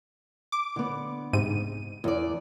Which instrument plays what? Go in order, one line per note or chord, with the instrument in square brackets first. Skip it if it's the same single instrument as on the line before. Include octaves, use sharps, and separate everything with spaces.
[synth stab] D6
[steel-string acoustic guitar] D3 B3
[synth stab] G#2 C3 D#7
[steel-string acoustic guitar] E2 D5